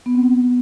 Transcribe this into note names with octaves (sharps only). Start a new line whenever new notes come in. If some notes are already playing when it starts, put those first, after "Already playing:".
B3
C4
B3